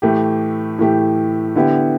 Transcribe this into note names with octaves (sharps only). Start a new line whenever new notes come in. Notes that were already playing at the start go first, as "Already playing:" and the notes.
A2 E3 A3 G4
A2 E3 A3 G4
D3 B3 E4 G4